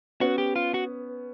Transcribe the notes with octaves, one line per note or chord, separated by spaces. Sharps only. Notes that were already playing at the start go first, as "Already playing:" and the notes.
B3 C#4 F#4
G4
F4
F#4